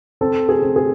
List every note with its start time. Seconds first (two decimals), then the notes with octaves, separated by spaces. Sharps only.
0.21 C4 A4
0.49 G#4
0.62 C4
0.76 G#4